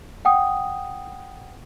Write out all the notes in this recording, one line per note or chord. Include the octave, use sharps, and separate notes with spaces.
F#5 G5 D#6